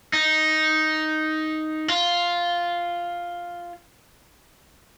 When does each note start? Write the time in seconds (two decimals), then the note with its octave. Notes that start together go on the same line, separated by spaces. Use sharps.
0.13 D#4
1.88 F4